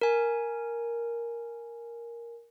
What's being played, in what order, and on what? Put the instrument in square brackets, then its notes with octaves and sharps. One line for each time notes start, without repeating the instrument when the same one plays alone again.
[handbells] A#4 G#5